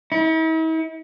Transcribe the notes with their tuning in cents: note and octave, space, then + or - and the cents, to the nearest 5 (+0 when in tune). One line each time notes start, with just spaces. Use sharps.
E4 -45